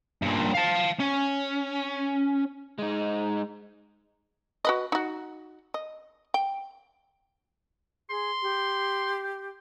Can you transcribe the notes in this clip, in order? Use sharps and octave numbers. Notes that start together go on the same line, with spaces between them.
G2 A#2
F5 A5
C#4
G#3 D#4
F#4 B4 D#5
D#4 F#4
D#5
G5
G#4 C6
G4